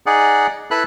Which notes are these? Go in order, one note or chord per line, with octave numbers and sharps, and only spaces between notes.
D#4 G#4 D5 F#5
E4 A4 B4 B5 F#6